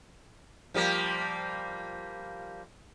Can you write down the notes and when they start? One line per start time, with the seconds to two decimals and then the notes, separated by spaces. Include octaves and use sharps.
0.74 F3 G3 A#3